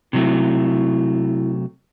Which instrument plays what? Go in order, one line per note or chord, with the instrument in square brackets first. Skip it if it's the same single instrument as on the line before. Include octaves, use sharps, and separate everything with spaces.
[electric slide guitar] C3 F#3 A3 [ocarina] E4